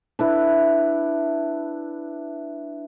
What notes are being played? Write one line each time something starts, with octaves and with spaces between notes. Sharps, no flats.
D4 E4 B4